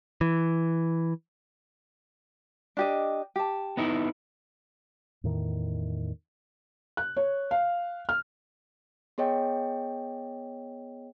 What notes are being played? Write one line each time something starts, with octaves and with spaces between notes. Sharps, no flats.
E3
D4 G4 D#5
G4 A5
B3 D#4 E4
E2 A2 D#3
F#6
C#5
F5
F6
B3 G#4 C#5 D#5 G5